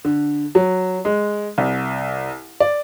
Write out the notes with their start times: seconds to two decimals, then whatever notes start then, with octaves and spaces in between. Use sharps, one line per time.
0.05 D3
0.55 F#3
1.05 G#3
1.58 C2
2.60 D5